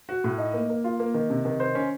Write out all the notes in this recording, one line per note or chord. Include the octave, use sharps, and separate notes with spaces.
F#4
A2
D#4
A#3
A#3
F4
A#3
D#3
C3
D#3
C5
C#4